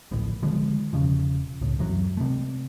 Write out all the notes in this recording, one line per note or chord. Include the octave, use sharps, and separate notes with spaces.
D1 A#1 A2
D3 D#3 F3 G#3
E1 C#3 F3
C#2 A2
F#2 E3 F#3
C3 A3